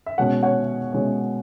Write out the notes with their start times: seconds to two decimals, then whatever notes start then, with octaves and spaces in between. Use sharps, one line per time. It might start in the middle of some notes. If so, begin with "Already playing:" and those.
0.06 E5
0.18 B2 G#3 C#4 C#5 F#5
0.43 C#5 F#5
0.93 B2 G#3 C#4 C#5